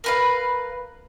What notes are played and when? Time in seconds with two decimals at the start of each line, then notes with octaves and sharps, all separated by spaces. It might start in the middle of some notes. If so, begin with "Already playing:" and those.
0.04 A#4 B4 F5